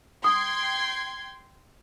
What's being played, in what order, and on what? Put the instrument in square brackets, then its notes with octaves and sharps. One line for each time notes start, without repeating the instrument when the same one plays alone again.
[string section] G5 C6 G#6 [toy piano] D#6